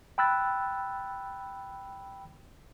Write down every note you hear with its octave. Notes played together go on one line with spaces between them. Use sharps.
G5 B5 E6 F#6 A6